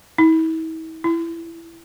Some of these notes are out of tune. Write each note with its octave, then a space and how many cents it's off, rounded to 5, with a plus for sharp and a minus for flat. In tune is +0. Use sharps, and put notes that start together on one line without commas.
E4 -45
E4 +15